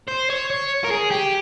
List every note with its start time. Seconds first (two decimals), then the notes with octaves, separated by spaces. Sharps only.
0.08 C5
0.30 C#5
0.50 C#5
0.84 A#4
0.91 G#4
1.11 G4